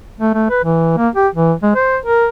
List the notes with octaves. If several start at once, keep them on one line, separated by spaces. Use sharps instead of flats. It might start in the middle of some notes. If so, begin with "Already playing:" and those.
A3
A3
B4
E3
A#3
G4
E3
G#3
C5
A#4